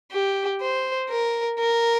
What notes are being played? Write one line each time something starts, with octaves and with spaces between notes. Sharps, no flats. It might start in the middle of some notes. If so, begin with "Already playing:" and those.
G4
C5
A#4
A#4